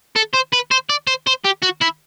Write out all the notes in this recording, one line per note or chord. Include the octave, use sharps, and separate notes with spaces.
A4
C5
B4
C5
D5
C5
C5
G4
F#4
E4